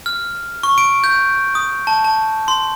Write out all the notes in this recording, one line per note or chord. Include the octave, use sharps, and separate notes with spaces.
F6
C#6
D7
G6
D#6
A5
A5
C6